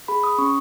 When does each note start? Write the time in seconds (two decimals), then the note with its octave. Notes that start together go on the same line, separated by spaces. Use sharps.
0.08 G#4 B5
0.24 D#6
0.38 C#4 C#6